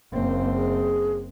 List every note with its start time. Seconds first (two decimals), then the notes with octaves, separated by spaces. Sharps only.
0.13 F#1 A#3 C4
0.55 G#4